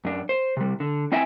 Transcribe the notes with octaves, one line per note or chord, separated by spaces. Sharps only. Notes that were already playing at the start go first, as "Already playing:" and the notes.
F#2 D4
C5
C3 G3
D3
C4 E4 D#5 E5 G5 G#5